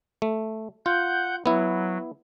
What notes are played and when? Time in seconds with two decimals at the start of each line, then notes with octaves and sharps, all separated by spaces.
0.22 A3
0.86 F4 F#5 G6
1.46 F#3 B3 E4